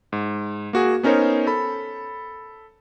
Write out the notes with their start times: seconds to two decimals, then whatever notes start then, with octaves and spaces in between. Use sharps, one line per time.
0.13 G#2
0.73 A#3 F#4 G#4
1.03 B3 C#4 D#4 A#4 C5 C#5
1.47 A4 B5